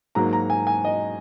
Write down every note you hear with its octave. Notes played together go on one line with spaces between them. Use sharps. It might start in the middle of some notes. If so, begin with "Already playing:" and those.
G#2 F#3 A#3 A#5
A#5
G#5
G#5
D#5